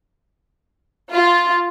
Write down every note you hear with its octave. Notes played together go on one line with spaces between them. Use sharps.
F4